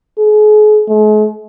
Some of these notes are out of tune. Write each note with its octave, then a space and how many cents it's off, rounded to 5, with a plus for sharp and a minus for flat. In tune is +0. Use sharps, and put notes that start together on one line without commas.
G#4 +40
G#3 +45